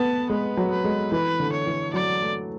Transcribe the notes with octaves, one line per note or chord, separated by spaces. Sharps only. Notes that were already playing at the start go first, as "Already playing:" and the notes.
Already playing: B3 A5
G#3 B4
F#3
B4
G#3
E3 B4
D3
C#5
E3
F#3 D5
A3